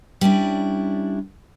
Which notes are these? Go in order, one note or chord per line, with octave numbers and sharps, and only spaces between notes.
G3 C#4 D4 E4